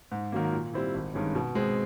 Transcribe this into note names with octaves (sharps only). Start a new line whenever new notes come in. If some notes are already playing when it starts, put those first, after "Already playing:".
G#2
D#3 F#3 A#3
A#2
G3 C4 E4
G#1
G2 D#3 G#3 C#4
B2
G#3 C4